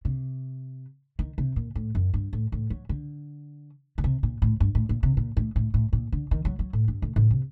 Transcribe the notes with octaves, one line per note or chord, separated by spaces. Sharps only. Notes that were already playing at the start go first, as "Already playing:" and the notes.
C3
D#3
C3
A#2
A2
F#2
G2
A2
A2
F#3
D3
D3
C3
A#2
A2
G2
A2
A#2
C3
A#2
A2
A2
A2
A#2
D3
D#3
F#3
F#3
A2
G2
A2
A2
C3